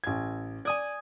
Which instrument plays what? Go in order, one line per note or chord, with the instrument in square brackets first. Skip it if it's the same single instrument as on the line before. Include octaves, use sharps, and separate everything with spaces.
[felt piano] A1 G#6
[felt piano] D5 [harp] G#5 D#6 G#6